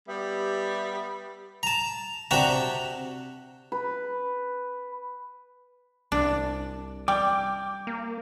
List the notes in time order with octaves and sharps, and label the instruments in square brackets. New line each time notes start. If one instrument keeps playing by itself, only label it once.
[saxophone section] G3 B3 G4 E5
[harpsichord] A5 A#5
C3 D4 F#4 G4 A5 A#5
[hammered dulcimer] B4
[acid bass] C2 [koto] D4
[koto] G3 [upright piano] G5 [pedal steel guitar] D6
[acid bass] A#3